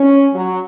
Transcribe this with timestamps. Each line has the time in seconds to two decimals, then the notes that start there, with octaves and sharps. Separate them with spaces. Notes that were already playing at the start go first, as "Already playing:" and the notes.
Already playing: C#4
0.34 F#3